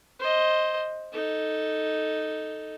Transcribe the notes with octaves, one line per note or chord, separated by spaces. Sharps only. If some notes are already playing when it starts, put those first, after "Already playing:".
C5 D#5
D#4 A4